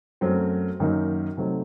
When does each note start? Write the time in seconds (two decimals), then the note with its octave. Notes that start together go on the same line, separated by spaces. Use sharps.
0.21 F#2 F#3 A3 C4
0.80 F#2 D#3 F#3 A#3 D#4
1.37 C3 F#3 A3 D#4